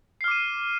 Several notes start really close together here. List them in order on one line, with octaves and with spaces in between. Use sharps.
C7 F6 D6 D#7